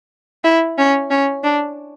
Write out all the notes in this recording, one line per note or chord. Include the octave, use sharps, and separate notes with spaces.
E4
C#4
C#4
D4